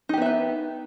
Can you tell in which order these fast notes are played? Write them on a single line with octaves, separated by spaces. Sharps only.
D#4 G4 B3 E5 B4